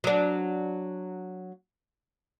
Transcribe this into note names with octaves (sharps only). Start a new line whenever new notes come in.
F#3 D4